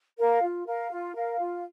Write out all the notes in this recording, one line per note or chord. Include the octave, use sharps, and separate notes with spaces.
A#4 F5
F4
A#4 F5
F4
A#4 F5
F4